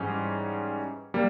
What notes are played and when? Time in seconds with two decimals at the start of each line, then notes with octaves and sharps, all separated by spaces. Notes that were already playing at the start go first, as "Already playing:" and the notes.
Already playing: G#2 E3 G3 C#4 G#4
1.14 G3 A#3